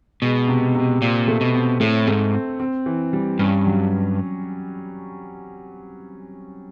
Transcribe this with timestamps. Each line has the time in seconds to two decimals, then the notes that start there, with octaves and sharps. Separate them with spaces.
0.22 B2 G#3
0.48 C3
0.75 C3
1.02 A#2 C4
1.28 A3
1.41 B2
1.55 C4
1.80 A2 A3
2.07 G#2 A3
2.34 C4
2.60 C4
2.86 E3
3.13 G3
3.39 G2 C#4
3.66 F#3